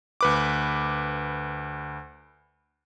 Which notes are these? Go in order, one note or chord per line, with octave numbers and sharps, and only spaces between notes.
D2 B4 D6